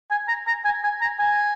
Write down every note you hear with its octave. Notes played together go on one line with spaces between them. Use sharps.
G#5
A#5
A#5
G#5
G#5
A#5
G#5